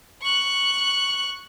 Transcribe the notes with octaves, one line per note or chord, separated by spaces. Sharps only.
C#6 F#6